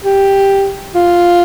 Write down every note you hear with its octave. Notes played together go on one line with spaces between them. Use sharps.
G4
F4